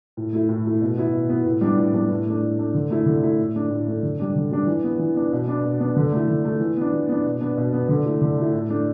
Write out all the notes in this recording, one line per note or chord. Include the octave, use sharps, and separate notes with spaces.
A2
A3 E4
A2
A3 E4
B2
B3 E4
B2
B3 E4
A2
G3 B3 D4
A2
G3 B3 D4
A2
A3 D4
A2
A3 D4
D3
A3 E4
D3
A3 E4
A2
A3 D4
A2
A3 D4
D3
G3 D4
D3
G3 D4
E3
B3 D4
E3
B3 D4
B2
B3 D4
B2
B3 D4
D3
A3 E4
D3
A3 E4
E3
B3 D4
E3
B3 D4
B2
B3 D4
B2
B3 D4
D3
A3 E4
D3
A3 E4
A2
A3 D4